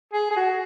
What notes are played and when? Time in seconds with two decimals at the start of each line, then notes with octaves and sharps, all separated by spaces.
0.13 G#4
0.31 G#4
0.37 F#4